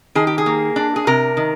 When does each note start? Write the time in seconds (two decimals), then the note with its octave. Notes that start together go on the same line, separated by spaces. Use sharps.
0.15 D#3 G#4
0.27 G4
0.38 G#4
0.46 A#3
0.76 D4
0.96 G#4
1.07 C3 A#4
1.37 D#3